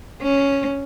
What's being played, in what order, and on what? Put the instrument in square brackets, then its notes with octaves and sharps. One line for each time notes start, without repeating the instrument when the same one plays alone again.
[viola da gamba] C#4